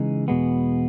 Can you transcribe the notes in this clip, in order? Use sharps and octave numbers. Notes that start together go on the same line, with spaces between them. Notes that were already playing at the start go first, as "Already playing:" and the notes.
Already playing: C#3 E3 G#3 D#4
E2 B2 G#3 B3